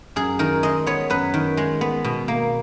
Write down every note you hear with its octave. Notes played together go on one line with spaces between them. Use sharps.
F#2 G#4
D#3 A#4
G#3 D#5
B3 C#5
F#2 B4
D#3
G#3
B3
B2
A#3